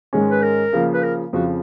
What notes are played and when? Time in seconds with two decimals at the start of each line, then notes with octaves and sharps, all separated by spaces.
0.13 G#2 D#3 G#3 C#4
0.31 B4
0.43 A#4
0.73 C#3 F3 A#3
0.94 B4
1.03 A#4
1.33 F2 C#3 F3 F#4